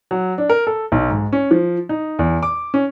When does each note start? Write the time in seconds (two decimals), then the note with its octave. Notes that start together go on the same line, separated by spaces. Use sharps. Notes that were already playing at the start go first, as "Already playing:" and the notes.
0.11 F#3
0.38 D4
0.50 A#4
0.67 A4
0.92 B1
1.11 G#2
1.33 C#4
1.51 F3
1.89 D#4
2.19 E2
2.43 D6
2.74 C#4